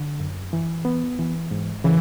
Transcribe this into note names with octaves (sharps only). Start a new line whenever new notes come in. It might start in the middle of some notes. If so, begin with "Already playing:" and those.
Already playing: D3
F#2
E3
B3
E3
G#2
C#3 E3